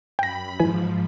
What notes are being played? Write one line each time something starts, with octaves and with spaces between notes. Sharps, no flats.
F#2 G5 B5 A#6
G#2 E3 F3 G#5